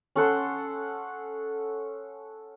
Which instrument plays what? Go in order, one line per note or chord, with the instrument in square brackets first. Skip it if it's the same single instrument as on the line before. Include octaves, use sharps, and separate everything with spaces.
[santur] C#4 A4 F#5 C6